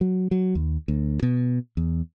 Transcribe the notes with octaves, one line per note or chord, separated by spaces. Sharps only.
F#3
F#3
D#2
D2
B2
E2